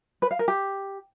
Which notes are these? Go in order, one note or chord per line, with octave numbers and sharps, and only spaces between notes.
B4
F5
A#4
G4